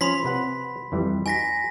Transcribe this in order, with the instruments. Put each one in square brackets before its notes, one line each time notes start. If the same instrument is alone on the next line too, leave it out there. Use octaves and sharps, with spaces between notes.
[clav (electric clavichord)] F3 C#4 [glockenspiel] B5 C6 B6
[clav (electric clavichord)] C3 B4 F#5
F2 E3 G3
[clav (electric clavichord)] D#4 F#4 [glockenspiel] G#5 A#6 B6